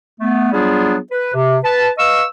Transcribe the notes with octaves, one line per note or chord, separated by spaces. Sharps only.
A3 B3
F#3 G3 B3 D4 F4 G#4
B4
C3
B4 A5
B4 D#5 F5 C#6 E6